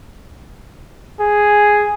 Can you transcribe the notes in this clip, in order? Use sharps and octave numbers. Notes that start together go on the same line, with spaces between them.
G#4